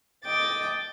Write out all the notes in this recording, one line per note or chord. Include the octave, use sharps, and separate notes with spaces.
D#5 G5 D6 A6